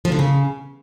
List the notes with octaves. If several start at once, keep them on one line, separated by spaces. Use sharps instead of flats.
F3
D3
C#3